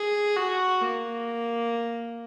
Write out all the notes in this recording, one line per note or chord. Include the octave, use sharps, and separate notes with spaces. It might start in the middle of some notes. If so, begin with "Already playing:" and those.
Already playing: G#4
F#4
A#3